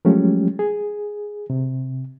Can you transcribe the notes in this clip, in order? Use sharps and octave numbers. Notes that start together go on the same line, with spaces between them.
F3 F#3 G#3 A3 C#4 G4
G#4
C3